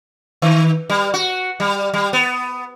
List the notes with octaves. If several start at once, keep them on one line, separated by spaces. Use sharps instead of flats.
D#3
G3
F#4
G3
G3
B3